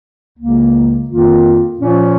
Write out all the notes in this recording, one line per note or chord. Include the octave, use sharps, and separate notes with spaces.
C#2 C#3 A#3
F2 D#3 A#3 F4
A#2 F3 C#4